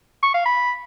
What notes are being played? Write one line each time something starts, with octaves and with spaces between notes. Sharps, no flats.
C#6
F5
B5